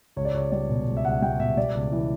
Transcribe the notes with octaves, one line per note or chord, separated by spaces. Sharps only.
C#2 C#5
D5
C#2 C#5
G3 D5
B2
C#2
E5
C#2 F#5
G3 G5
B2 E5
G3 D5
C#2
E3